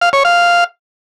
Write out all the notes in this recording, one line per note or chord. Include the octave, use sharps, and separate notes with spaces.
F5
C#5
F5